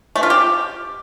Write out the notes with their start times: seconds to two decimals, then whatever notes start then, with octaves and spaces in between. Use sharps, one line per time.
0.16 A3
0.23 F4
0.30 G4